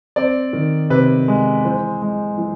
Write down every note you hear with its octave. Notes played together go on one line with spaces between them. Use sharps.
C4 D5
D#3
C3 B4
G#3
E3 C5
G#3
E3